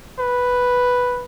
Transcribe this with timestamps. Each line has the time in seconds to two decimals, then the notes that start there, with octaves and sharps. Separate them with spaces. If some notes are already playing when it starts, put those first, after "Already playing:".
0.19 B4